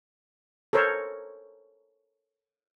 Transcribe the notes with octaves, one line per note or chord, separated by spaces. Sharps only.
A4 A#4 C5 C#5